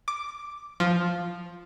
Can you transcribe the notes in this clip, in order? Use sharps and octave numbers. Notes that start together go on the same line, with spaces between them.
D6
F3